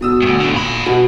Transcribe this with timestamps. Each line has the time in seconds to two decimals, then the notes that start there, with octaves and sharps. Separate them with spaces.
0.01 B2 D#6 E6
0.22 D2 G2
0.40 A2 D3
0.54 A#2 B5
0.86 B2 F#4